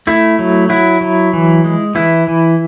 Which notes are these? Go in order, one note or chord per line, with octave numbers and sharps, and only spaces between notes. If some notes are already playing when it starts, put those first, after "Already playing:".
A3 E4
F#3
F#3 E4
F#3
E3
G#3
E3 E4
E3